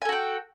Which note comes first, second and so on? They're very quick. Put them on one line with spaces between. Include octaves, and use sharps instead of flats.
G#5 A4 F#4 G5